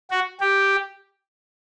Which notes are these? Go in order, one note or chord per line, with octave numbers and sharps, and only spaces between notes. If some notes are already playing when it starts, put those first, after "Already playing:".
F#4
G4